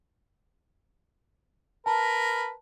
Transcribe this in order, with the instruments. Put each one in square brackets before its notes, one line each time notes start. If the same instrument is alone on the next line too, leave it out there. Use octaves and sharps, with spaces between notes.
[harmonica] A#4 B4 [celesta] A5